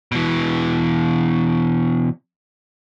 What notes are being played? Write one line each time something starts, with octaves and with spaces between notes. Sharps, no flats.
B2 E3